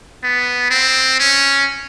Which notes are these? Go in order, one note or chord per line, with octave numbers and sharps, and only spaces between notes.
B3
C4
C#4